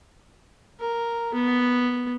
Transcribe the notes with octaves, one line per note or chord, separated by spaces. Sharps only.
A#4
B3